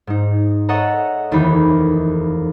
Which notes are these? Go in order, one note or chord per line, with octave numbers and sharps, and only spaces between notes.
G#2 D#4
A4 C#5 D#5 E5 F#5 A#5
F1 D#2 D#3 E3 D#4 B5